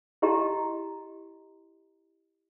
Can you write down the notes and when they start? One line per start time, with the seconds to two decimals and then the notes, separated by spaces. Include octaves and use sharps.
0.22 E4 G4 D#5 A5 A#5 C6